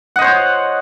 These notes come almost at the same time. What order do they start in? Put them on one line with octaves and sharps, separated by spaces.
F#5 D#5 C5 C#5